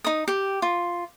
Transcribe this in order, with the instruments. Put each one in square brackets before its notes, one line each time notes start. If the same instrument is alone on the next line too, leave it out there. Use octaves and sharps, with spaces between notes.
[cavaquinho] D#4 D#6
G4
F4